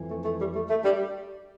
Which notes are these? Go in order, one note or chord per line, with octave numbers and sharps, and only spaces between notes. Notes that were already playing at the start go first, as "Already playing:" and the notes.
Already playing: F2 E3
A3
A3
G3
A3
A3
G3